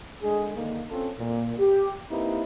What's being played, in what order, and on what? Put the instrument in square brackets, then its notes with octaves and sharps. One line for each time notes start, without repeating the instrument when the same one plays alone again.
[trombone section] D3 G#3 G#4
D3 D#3 A#3
C4 C#4 F4 A4
A#2
G4
A#3 C4 D#4 E4 G4 B4